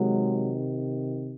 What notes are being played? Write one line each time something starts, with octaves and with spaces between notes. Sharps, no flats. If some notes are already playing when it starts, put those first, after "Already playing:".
Already playing: C3 D#3 F#3 G#3